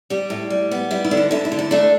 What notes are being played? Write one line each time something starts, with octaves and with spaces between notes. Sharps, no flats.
G3 G4
A2
G3
B3
G3 E4
E4
D3
D4
D3 E4
E4
D3
E4
A3 D4